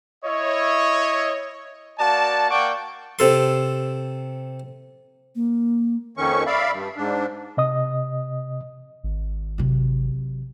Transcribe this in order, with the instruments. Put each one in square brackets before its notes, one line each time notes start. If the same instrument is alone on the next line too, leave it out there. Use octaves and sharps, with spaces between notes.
[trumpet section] E4 C#5 D#5
A#3 F#4 D5 A5
A#3 D5 F#5 G5 C#6 D6
[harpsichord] C3 A4 C6
[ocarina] A#3
[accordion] F2 D#3 C#4 C#6
D5 E5 F5 B5
G2
G#2 D4
[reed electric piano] C3 D#5 D#6
[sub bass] G#1
[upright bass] C3 F#3